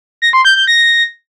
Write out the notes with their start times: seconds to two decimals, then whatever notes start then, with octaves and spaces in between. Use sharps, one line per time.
0.22 A#6
0.33 C6
0.45 G6
0.56 G6
0.67 A#6